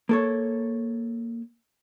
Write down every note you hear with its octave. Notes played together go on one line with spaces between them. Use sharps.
A#3 A4 C#5